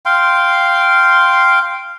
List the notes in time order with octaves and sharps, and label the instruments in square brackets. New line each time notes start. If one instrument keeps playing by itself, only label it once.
[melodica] F5 G5 C6